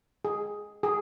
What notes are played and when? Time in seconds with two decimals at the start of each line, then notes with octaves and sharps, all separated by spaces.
0.25 G#4
0.83 G#4